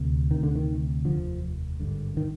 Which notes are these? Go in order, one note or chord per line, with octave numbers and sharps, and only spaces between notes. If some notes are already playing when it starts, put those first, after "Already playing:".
Already playing: D2 C3
D2 C3 D#3
D3
D#3
F1 D#2 D3 F3
G#1 G2 D3
D#3